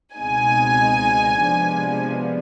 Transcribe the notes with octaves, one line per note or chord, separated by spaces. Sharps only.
C#2 B2 G#3 C4 D#4 G#5
C3 F3 G#3 B3 D4